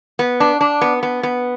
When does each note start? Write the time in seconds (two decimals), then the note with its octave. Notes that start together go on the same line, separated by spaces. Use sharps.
0.19 B3
0.40 D4
0.61 D4
0.81 B3
1.03 B3
1.23 B3